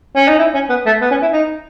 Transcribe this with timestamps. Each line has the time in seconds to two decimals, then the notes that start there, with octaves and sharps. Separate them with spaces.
0.16 C#4
0.28 D#4
0.38 E4
0.54 C#4
0.69 B3
0.86 A3
1.01 B3
1.11 C#4
1.22 E4
1.33 D#4